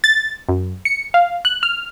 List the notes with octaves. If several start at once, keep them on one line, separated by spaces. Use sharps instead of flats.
A6
F#2
C#7
F5
F#6
F6